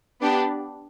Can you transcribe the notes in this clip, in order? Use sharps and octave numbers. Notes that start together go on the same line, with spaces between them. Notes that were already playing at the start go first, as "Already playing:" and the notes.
B3 D4 G4